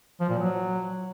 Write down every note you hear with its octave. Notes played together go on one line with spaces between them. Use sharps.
F3
A#2
F#3